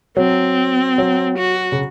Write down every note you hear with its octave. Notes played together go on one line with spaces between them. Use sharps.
F#3 C4
F#3
F#4
C#3